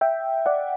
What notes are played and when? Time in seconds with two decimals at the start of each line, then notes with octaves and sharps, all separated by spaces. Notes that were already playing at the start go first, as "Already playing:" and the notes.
0.01 E5 G5
0.46 D5 F#5